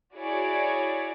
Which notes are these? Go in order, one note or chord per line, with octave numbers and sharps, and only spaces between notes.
E4 F#4 G#4 C#5 D5